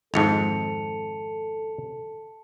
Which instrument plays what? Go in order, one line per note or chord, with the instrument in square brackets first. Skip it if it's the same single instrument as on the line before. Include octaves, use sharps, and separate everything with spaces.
[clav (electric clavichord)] G#1 F2 G#2 [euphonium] A4 [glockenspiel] A5 C#7 F7